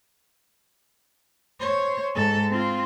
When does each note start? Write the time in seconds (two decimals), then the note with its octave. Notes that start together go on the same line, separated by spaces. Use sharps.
1.60 C5 C#5
2.15 G#2 A4
2.50 C4 F4